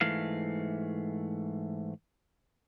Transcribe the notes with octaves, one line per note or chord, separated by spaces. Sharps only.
G#2 E3 A3 F5